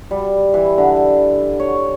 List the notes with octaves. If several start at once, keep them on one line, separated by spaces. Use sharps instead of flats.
G3
E3
D3
C#5